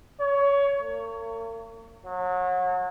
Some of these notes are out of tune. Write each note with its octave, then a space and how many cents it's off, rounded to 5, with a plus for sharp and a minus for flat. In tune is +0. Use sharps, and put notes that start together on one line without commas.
C#5 +20
A#3 -40
F#3 -30